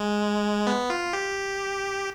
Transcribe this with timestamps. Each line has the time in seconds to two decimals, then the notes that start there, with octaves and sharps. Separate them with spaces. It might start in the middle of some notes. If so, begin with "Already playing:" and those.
Already playing: G#3
0.67 B3
0.90 F4
1.13 G4